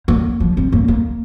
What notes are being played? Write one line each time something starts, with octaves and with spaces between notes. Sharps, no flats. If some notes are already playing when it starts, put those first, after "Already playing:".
A#3
F3
C4
A#3
A#3